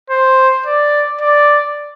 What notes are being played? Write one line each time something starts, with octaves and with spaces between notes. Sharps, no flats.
C5
D5
D5